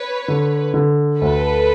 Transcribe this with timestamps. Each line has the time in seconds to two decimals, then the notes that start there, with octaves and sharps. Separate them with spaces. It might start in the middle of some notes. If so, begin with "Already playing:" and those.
Already playing: B4 C#5
0.28 D3
0.74 D3
1.20 D2 A4 B4